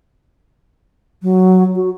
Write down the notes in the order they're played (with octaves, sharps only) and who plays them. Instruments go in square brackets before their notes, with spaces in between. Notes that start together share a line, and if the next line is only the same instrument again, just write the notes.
[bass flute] F#3
F#4